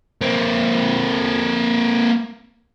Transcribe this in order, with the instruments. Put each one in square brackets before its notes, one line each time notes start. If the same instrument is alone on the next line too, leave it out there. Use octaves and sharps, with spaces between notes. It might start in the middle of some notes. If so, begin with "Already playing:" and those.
[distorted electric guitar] A#3 C4